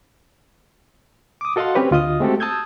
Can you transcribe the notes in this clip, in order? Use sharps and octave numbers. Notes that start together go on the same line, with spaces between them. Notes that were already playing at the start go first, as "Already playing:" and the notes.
D6 D#6
F#4 A4 D#5 F5 F#5 C6
C4 C#4 G4 B4 C#5
D2 F4 D#5 D#6
G#3 A3 C4 F#4 G4 A4
A5 D#6 E6 G6 G#6